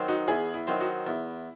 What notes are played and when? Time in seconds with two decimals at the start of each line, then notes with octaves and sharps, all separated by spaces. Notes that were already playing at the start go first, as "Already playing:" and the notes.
Already playing: D#3 F#3 C4
0.08 D#4 F#4
0.28 E2 E4 G#4
0.54 E4
0.67 D#3 F#3 C4
0.80 D#4 F#4
1.07 E2 E4